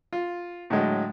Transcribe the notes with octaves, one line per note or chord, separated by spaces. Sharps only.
F4
A2 D3 F#3 G#3